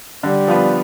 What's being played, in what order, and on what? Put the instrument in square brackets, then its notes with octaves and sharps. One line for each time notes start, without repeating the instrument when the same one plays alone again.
[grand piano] D3 [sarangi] G3
[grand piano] F3 B3 F4 B4